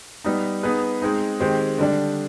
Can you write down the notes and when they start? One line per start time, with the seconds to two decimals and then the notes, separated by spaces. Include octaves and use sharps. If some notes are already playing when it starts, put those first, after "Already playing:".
0.24 G3 B3 D#4
0.63 B3 D#4 G#4 B4
1.02 G#3 C4 D#4
1.40 D#3 G#3 C4 G4 C5
1.78 D3 G3 D4